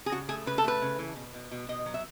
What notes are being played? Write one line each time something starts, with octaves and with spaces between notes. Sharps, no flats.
G#4
C#3 F#4
A3 G#4
C#3 B4
A4
A3 B4
C#3
E3
B2
B2
B2
B2 D#5
F#3
E5